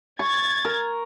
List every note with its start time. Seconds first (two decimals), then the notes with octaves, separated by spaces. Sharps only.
0.19 C#6 G#6 A6
0.65 A#4